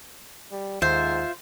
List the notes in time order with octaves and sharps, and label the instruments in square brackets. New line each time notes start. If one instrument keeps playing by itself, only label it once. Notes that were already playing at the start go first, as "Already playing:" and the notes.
[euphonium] G3
[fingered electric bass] D#2 [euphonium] G#2 [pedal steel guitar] F4 E5 [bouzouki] C5